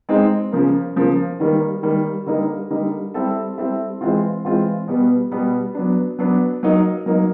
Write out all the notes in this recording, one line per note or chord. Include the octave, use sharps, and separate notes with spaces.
G#3 C4 D#4
C#3 F3 A#3
C#3 F3 A#3
D#3 G3 A#3
D#3 G3 A#3
D3 G3 A#3 D#4
D3 G3 A#3 D#4
G3 C4 E4 A4
G3 C4 E4 A4
E3 G#3 C4 F4
E3 G#3 C4 F4
B2 G3 B3
B2 G3 B3
F#3 B3 D4
F#3 B3 D4
F#3 A#3 D#4
F#3 A#3 D#4